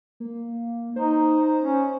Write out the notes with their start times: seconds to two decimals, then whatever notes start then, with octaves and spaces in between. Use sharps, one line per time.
0.20 A#3
0.96 D#4 C5
1.60 C#4